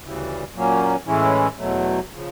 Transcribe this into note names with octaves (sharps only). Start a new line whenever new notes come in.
D2 C#3 E3 G3
A#2 F#3 A#3 C#4
A2 E3 G#3 C#4 E4
E2 B2 F#3 A3
C#3 F3